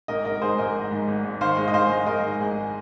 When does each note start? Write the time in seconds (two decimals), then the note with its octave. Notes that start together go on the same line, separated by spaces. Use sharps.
0.08 G#1 A#4 D#5
0.25 G#2 A#4 D#5
0.42 G#2 G#4 C5
0.58 G#1 A#4 D#5
0.75 G#3
0.91 G#2
1.08 G#1
1.25 G#1
1.41 D#3 C5 F5
1.57 G#3
1.68 D#5
1.74 G#3 C5 F5
1.90 G#3
2.06 G#2 A#4 D#5
2.23 G#2
2.40 G#1 G#4